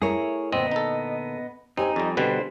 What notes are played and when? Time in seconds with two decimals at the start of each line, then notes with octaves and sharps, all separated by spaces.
0.02 A3 E4 G#4 A#4 C#5
0.52 A#2 D3 B3 C4 D#5
0.72 D#4 A4
1.77 C4 D#4 G4 C#5 G#5
1.96 F2 G3
2.17 B2 D3 G3 B4 C5